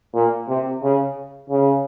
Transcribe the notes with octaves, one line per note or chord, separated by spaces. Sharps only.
A#2
C3
C#3
C#3